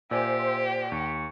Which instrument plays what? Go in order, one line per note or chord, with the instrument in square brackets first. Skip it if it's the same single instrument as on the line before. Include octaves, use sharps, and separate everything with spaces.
[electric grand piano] A#2 D5 G#5 [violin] G4 [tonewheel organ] C5 [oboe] E5
[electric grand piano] D#2 [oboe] C#6